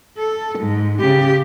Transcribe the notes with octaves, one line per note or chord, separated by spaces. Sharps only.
A4
G#2
C#3 G4